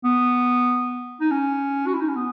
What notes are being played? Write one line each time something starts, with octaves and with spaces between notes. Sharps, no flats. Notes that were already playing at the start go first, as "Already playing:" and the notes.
B3
D#4
C#4
F#4
E4
D#4
C#4
B3